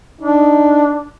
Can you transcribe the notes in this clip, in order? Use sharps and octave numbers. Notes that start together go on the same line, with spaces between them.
D4 D#4